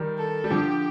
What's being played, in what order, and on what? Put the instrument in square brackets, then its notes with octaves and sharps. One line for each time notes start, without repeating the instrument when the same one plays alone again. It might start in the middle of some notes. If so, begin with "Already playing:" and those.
Already playing: [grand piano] D#3 G3
[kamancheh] A4
[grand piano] G3
[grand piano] D3 F3 [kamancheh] G4